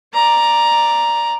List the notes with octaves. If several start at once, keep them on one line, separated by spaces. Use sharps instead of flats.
D5 A#5